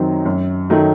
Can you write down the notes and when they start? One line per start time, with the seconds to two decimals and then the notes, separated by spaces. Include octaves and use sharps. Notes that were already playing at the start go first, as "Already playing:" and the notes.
Already playing: F#2 D#3 F#3 C4 D#4
0.25 F#2
0.70 D#3 F#3 A3 D#4